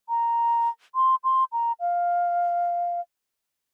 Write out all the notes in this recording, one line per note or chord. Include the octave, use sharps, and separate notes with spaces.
A#5
C6
C6
A#5
F5